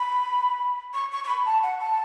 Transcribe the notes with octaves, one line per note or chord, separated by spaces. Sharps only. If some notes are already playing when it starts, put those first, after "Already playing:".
Already playing: B5
C#6
C#6
C#6
B5
A5
F#5
A5